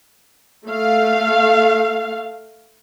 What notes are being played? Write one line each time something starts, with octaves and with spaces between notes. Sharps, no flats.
A3 F5